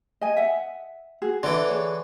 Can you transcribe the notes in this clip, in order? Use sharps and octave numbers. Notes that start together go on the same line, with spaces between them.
D#5 G#5
E5 F#5
F#4 G#4
D3 E3 D4 D5
G#4 C#5